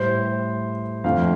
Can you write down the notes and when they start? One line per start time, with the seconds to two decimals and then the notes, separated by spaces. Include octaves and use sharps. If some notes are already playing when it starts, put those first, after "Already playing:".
Already playing: A2 G3 C5
1.04 F2 D3 A3 F5